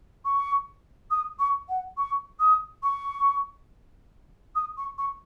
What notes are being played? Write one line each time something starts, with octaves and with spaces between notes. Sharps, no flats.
C#6
D#6
C#6
F#5
C#6
D#6
C#6
D#6
C#6
C#6